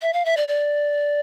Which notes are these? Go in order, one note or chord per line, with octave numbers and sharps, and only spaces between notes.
E5
F5
E5
D5
D5